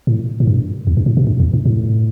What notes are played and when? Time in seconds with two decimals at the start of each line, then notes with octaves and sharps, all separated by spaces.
0.07 A2
0.40 A2
0.47 G2
0.87 E2
0.97 G2
1.06 A2
1.17 B2
1.27 G2
1.40 E2
1.53 G2
1.66 A2